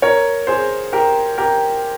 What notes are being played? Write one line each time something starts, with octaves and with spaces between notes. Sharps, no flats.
A#4 C#5
G#4 C5
G4 A#4
G4 A#4